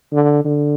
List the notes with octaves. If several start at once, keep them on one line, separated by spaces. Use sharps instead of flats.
D3
D3